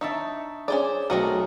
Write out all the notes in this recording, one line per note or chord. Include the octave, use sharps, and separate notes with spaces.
D4 D#4 E5 C#6
C#4 G#4 C5 D5
B1 A3 C4 F#4 A#4 D#5